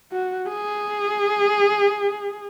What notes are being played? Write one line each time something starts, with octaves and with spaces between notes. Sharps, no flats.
F#4
G#4